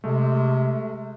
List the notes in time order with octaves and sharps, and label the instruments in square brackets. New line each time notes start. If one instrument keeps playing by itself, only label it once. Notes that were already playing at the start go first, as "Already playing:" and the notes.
[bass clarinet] C3 [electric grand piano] G#3 A3